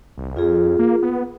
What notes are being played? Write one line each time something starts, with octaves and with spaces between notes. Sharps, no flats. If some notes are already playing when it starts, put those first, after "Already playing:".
C2
F2 F4 G#4
A#3
B3